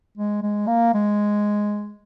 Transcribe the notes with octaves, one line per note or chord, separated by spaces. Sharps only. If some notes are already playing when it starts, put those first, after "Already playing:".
G#3
G#3
A#3
G#3